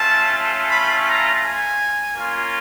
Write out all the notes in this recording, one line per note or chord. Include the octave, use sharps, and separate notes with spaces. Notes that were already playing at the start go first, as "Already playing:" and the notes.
Already playing: A3 C#4 F4 A5
B5
A#5
G#5
A#3 C#4 F4